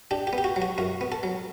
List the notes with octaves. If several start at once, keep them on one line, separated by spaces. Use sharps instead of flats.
D4 G4
G4
B3
G4
F#4
F#3
F#4
F#2 F#4
B3
A4
F#3